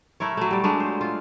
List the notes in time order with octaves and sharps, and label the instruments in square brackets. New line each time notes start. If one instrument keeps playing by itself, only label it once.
[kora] A3 E4 A#4 C#5
F#3 A3
G3 D5
F#3 G#3 A3 D4
C5
F4